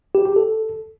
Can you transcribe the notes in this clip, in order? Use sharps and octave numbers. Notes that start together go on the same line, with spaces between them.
G4
G4
A4